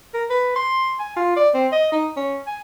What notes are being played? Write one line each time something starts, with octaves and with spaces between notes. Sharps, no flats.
A#4
B4
C6
G#5
F4
D5
C4
D#5
D#4
C#4
G#5